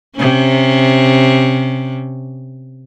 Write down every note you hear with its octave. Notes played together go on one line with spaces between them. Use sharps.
C3 C#4